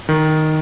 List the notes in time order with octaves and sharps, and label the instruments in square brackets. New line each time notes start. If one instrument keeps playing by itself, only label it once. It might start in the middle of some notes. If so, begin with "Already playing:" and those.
[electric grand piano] D#3